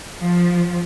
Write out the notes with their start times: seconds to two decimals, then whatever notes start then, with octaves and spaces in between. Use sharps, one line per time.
0.18 F3